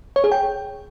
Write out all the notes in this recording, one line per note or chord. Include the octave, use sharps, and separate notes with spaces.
C#5
G#4
G5